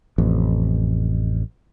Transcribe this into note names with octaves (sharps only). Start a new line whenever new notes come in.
A1 F2